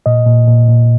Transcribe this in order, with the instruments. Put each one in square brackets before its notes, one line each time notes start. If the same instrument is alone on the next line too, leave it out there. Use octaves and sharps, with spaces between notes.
[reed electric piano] A#2 D#5
A#2
A#2
A#2